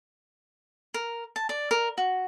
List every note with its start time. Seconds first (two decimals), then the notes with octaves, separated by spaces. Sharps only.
0.94 A#4
1.36 A5
1.49 D5
1.71 A#4
1.98 F#4